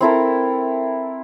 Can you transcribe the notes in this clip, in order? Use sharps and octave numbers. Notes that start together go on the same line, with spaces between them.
C4 E4 A4 A#4